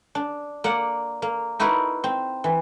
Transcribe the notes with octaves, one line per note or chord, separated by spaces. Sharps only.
D4
A#3 D5 F#5
A#3
D#4 E4 F#4 A#4 B4
C4
E3